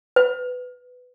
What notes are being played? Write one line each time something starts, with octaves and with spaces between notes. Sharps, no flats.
B4